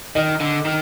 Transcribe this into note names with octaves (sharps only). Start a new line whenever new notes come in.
D#3 D#5
D3
D#3